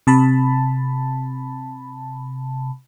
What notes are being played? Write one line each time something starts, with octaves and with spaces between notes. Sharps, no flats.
C3 A5 B5